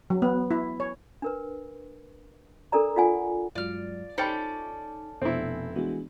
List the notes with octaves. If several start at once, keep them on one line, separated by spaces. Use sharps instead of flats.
F#3
B3
E4
C#5
D4 A#4 B4
D4 A4 A#4 D5 A#5
F4 D5 F#5 G#5
G2 F#3 G#3 F4 D5 F6
C#4 D#4 A4 C5 D5 G5 B5
F1 B2 B3 C4 D4 E4
E3 G#3 B3 D4 F#4